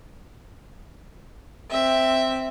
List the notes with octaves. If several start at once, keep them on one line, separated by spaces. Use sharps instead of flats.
C4 E5